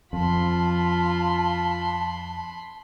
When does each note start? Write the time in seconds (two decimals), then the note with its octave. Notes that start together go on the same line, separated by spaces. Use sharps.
0.13 F2 F4 A5 B5 C6